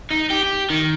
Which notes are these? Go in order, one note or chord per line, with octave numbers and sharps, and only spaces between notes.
D#4
G4
G4
D#3